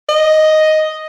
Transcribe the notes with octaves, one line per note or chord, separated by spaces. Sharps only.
D#5